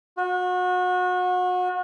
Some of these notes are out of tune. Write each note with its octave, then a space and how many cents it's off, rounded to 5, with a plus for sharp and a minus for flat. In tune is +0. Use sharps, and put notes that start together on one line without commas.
F#4 -30